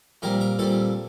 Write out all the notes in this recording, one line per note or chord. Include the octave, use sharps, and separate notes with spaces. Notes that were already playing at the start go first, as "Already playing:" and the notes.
A#2 G3 C4 A#4
A#4
A#2 G3 C4 A4